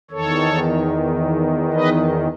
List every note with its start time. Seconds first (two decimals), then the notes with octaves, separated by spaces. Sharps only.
0.11 E2 D#3 A4 C#5
1.73 B4 D#5